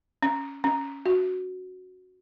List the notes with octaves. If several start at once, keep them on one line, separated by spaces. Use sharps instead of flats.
C#4
C#4
F#4